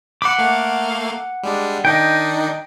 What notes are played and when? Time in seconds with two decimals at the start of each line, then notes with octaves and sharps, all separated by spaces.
0.22 F#5 B5 C6 D6 E6
0.39 A3 A#3 F5
1.43 G3 G#3 D4
1.85 D#3 D4 D#4 D#5 G5